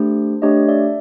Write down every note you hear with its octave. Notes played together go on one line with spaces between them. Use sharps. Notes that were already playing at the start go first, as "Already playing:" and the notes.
Already playing: A3 D4 G4 C5
A3 D4 G4 C#5 D#5
D5 E5